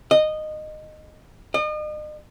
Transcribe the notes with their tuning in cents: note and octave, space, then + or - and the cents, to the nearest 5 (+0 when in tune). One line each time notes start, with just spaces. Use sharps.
D#5 -15
D#5 -40